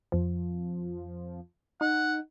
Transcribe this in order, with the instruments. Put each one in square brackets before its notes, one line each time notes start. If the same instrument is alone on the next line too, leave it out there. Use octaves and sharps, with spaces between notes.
[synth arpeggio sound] F2 F3
[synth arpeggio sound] D#4 [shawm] F#5